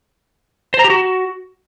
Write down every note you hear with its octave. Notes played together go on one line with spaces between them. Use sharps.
C5
A#5
G4
F#4